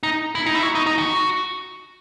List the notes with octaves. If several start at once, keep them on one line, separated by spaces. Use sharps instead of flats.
D#4
E4
D#4
E4
F#4
D#4
D#4
F#4